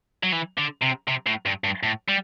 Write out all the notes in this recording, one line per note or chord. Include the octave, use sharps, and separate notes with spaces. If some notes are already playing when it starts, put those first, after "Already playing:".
F#3
E3
D3
C3
C3
A2
G2
G2
A2
G3